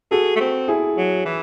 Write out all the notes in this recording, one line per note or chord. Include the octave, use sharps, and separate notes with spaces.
F#4 G#4 A4
A3
C4
E4 G#4
F#3
E3